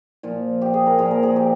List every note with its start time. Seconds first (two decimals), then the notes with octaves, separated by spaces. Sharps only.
0.23 A#2 F3 F4
0.62 G4
0.74 G#4
0.86 A#4
0.98 A#2 F3 G#4
1.11 A#4
1.23 G#4
1.36 G4